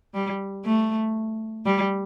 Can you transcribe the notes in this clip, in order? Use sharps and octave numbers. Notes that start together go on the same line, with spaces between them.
G3
A3
G3